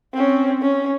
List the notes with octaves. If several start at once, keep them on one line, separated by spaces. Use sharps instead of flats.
C4 C#4
C#4